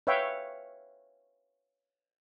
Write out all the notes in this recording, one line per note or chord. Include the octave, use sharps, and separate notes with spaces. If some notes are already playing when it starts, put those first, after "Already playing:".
B4 C#5 E5 F5 G5